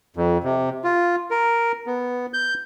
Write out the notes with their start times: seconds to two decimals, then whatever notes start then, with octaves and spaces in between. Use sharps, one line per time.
0.17 F2
0.44 C3
0.84 F4
1.31 A#4
1.87 B3
2.34 G6